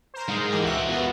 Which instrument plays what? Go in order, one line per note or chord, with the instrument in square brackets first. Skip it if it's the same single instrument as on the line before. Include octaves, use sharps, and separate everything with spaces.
[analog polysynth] A#4 C5
[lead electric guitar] G#2 G#3
[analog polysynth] E3 G4 A#4
[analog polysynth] C#2 F#6 [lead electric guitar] F#4 E5
[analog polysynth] B3 F4